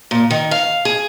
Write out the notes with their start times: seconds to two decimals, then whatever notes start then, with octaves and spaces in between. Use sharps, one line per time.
0.11 A#2
0.31 D#3
0.51 F5
0.85 G#4